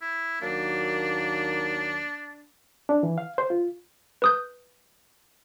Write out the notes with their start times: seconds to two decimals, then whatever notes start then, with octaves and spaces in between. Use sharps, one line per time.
0.01 E4
0.41 D#2 F#3 A#3 D4
2.89 D4
3.03 E3
3.18 F5
3.38 C5
3.50 F4
4.22 B4 D#6 G6